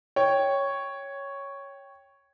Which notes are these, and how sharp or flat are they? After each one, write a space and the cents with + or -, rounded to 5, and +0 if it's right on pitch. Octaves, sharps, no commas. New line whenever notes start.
C#5 +0 G5 +0